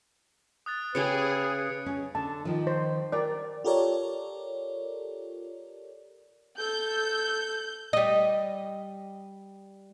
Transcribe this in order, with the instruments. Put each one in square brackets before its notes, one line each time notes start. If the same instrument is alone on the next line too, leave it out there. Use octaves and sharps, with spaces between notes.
[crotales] D#6 F#6 A6
[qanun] C#3 C#4 G4 [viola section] G#4 [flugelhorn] B4 [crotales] C#7 D7
[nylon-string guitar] C#4
[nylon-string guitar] D3 [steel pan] A5
[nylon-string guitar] D#3 F3
[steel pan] C5
[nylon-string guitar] A#4 G5 [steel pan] D5
[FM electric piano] F4 G4 A4 A#4 C#5 D5
[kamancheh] A4 [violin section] G6
[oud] G3 D#5